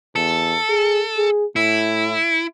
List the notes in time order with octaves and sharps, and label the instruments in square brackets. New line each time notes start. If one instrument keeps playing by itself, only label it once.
[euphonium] E2 [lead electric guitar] A4
[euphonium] G#4
G#4
[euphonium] A2 [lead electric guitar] E4